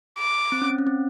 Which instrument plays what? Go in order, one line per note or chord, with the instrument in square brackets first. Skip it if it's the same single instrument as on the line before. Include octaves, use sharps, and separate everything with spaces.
[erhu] D6
[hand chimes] C4
C#4
C4
C#4
C4